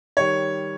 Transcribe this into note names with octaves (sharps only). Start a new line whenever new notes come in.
D#3 G3 C#5